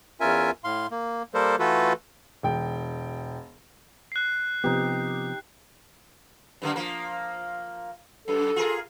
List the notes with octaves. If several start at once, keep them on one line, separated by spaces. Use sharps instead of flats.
E2 C#4 F4 A#4 E5 G#5
A2 F5 C6
A#3
G3 A#3 A4 A#4 C5
E3 A3 F4 F#4 A4 B4
E1 G5
F#6 C7
C3 F3 B3 D#4 G4
F#2 D3 A#3
F3 A#3
F#2 A4
F4 G#4 A#4